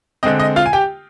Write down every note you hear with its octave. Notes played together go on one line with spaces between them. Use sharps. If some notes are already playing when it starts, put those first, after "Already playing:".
D3 G#3 C4 D#5
D#5
F4 F5
G#5
G4 G5